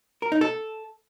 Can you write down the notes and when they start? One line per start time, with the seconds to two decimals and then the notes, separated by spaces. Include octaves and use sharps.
0.22 A#4
0.32 D#4
0.41 A4